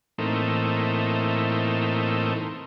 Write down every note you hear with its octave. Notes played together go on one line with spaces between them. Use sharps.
A2 E3 A3 A#3 C4 D#4